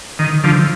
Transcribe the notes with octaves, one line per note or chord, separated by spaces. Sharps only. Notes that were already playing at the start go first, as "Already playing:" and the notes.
D#3
D3 F3